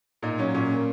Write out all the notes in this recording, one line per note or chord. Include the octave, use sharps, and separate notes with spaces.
A#2 D#4
F#3 C#4
A#2 C#4
A#3